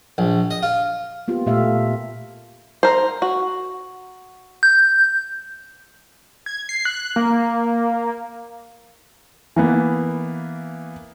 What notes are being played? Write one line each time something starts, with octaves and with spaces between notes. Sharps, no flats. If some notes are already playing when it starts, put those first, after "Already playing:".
A#1
D#5
F4
A#3 B3 F4 G4
A#2 A3 A#3 G4 E5 F5
A#4 C5
F#4
G6
G#6
C7
F#6
A#3
E3 A#3 B3